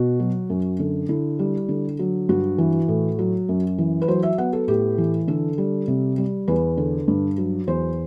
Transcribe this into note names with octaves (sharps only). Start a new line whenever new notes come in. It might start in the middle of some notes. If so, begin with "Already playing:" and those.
Already playing: B2 F#4
F#3
F#2
D3
D3 E4
G3
D3
F#3
G2 F#4
E3
A2
F#3
F#2
E3
B4
F#3 C5
E5
B3 F#5
A4
A2 G4
E3
D3 A4
G3
C3
G3
E2 B4
D3
G2
F#3
E2 C5